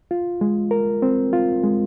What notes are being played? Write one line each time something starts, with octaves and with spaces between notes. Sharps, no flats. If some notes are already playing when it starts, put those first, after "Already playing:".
F4
G#3
A#4
C4
F4
G#3